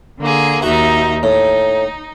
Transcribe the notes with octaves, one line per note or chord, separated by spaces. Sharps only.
D3 A#3 G#4
D#2 D#4 F#4 E5
A2 D#4